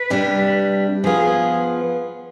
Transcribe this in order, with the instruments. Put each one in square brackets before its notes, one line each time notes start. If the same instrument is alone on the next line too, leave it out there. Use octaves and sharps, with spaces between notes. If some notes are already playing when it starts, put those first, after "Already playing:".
Already playing: [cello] B4
[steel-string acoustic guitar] C3 G3 D4
[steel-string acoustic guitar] F3 B3 F4 [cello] G#4